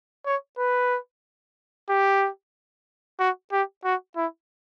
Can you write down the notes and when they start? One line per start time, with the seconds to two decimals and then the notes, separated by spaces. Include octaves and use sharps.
0.26 C#5
0.58 B4
1.89 G4
3.19 F#4
3.52 G4
3.85 F#4
4.16 E4